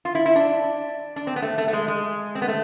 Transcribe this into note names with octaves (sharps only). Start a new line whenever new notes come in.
F4
E4
E4
D4
D4
C4
B3
A3
A3
A3
G#3
G#3
C4
B3
A3